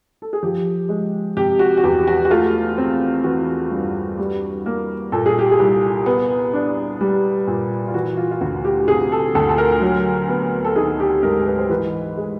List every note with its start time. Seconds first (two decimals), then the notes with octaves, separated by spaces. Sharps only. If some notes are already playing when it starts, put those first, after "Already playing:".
0.22 A4
0.33 G#4
0.43 F3 G4
0.89 G#3
1.37 C3 G4
1.59 F#4
1.77 F#4
1.84 E2 G4
2.08 F#4
2.25 F#4
2.30 A3 F4
2.78 C4
3.24 E3 F#4
3.71 G2
4.18 G3
4.66 A#3
5.12 A#2 A4
5.26 G#4
5.39 G4
5.51 G#4
5.59 C2
6.06 B3
6.53 D4
7.01 G3
7.47 A#2
7.88 F4
7.94 E3 F#4
8.17 F4
8.31 F4
8.41 D2 F#4
8.64 G4
8.88 C3 G#4
9.12 A4
9.35 D2 A4
9.49 A4
9.58 A#4
9.81 F#3
10.28 B3
10.65 A4
10.76 D#3 G#4
11.00 G4
11.23 G#2 A#4
11.47 B4
11.59 C5
11.70 E3 B4
12.17 G#3